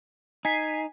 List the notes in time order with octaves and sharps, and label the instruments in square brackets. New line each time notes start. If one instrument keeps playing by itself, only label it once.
[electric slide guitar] D#4 [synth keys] G#5 B6 C7